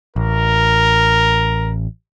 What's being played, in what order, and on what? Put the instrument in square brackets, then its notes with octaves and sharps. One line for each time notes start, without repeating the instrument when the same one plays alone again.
[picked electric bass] A1 [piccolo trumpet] A#4